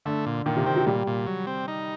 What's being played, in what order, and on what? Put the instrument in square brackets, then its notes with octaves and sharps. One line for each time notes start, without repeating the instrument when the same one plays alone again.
[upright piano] D3 [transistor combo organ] A3
[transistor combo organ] A#2
[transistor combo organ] A#2 [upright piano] D#3
[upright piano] C3
[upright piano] D#3 [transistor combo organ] C4
[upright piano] F#3
[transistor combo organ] A#2 [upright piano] G3
[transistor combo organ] A#2
F#3
C4
D#4